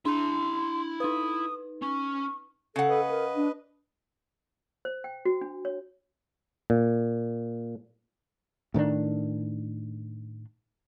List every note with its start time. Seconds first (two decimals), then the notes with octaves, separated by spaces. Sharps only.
0.05 D4 E4 A#5 C6
1.00 D#4 B4 D#6
1.82 C#4 C#6
2.76 C#3 A4 F#5
2.89 B4 D#5
3.10 A#4
3.35 D4
4.85 C5
5.04 G5
5.25 F#4
5.41 D4
5.65 C#5
6.70 A#2
8.74 A2 D#3 C4 D4